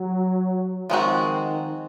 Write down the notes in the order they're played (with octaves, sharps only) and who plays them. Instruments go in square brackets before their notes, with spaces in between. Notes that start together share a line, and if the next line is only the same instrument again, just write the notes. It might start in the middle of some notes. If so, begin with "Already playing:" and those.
Already playing: [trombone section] F#3
[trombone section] D#3 [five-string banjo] F3 G#3 C4 F#4